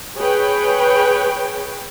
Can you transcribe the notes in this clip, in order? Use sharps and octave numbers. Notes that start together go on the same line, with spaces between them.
G#4 B4 C#5 G5